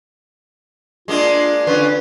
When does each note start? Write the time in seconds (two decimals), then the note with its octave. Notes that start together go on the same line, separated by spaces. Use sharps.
1.08 G#3 A#3 D4 F4
1.67 D3 C#4 F4 B4